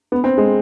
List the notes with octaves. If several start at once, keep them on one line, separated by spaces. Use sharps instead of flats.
B3
C4
G#3